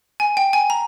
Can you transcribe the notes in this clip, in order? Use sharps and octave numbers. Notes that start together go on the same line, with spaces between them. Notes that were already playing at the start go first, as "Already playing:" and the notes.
G#5
G5
G#5
A#5